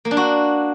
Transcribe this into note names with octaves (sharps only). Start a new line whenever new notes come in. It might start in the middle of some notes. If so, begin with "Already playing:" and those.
A#3
D4
F#4